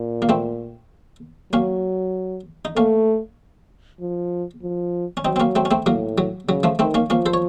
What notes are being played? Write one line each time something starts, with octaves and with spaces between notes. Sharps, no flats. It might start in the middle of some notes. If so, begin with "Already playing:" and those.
Already playing: A#2
A#3
A3 C4
F#3 A#3 C#4
D#4
A3 A#3 C#4
F3
F3
C#4
F#3 C4 D#4
C4
A#3 C#4
A3 C4
C#4
A3 C4
A2 F#3 A#3
F#3
C#3 F#3
F3 A3
D#3 A3 C4
A#3 C#4
F3 A#3 C#4
A4 C5
C#5